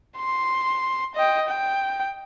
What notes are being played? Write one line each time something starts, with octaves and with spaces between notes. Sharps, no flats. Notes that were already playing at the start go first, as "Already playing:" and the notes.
C6
D#5 G5
G5